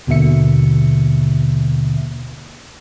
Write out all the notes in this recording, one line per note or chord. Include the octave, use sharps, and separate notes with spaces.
D#2 B2 D3 A#3 E5 C#7